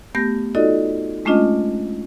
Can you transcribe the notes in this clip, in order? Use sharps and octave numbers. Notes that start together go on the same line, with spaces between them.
A3 B3 G4 G6 A#6
D#4 F4 F#4 A4 D5 D#5
G#3 A3 C#4 D4 F4 D#5